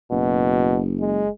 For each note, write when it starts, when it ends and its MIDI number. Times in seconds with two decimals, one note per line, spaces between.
0.11 1.26 30
0.11 0.80 47
1.00 1.30 56